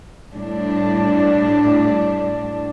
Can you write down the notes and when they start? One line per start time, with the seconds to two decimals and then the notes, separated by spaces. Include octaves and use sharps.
0.34 A2 G3 D4